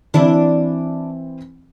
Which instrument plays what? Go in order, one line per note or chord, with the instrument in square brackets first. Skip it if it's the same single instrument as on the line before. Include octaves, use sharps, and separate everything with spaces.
[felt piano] E3 C4 [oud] D4 E4